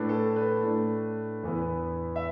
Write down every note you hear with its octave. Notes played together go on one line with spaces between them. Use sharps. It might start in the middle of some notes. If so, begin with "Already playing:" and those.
Already playing: A2 A3 D4 B4
A4
B4
A2 A3 D4
E2 E3 B3
E5